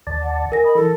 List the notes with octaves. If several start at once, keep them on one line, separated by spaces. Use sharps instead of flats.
D#2 D5 A5
F#5
A#4 G#5 A#6
D#5 B5
E3 A4